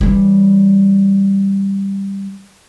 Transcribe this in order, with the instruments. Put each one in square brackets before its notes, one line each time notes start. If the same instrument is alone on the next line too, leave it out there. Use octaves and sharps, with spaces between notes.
[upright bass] E3 G3